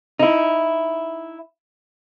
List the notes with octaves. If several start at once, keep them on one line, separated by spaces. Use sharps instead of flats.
D#4 E4